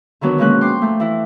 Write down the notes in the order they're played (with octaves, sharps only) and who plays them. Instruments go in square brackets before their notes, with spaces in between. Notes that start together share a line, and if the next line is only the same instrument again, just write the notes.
[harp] D3 D#3 F#3 B3 D4
B2 F3 G#3 A#3 C#4 F#6
G5 C6 D6
A3 G6
E3 E4